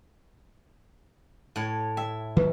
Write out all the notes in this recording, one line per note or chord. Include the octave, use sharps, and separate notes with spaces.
A2 C#5
E5 G5
D#3 F#3 G3 B4